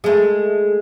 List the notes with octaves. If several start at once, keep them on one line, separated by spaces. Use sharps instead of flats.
G#3 A3